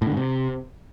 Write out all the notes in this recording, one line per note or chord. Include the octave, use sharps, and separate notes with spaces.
A2
D3
G#2
C3